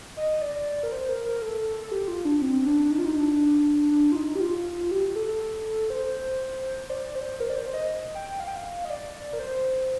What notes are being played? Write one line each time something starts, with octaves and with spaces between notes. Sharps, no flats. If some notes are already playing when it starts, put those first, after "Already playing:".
D#5
D5
A#4
C5
A#4
A#4
A4
A4
G4
F4
D4
C4
C4
D4
D#4
F4
D#4
D4
D4
F4
D#4
G4
F4
G4
A4
C5
D5
C5
A#4
D5
C5
D#5
G5
F5
G5
F5
D#5
D5
A#4
C5